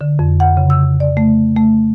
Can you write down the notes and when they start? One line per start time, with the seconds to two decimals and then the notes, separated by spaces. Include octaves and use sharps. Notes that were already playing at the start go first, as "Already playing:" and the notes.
0.01 D3
0.19 F2
0.40 F#5
0.57 C#3
0.70 E6
1.00 D5
1.17 A3
1.57 A3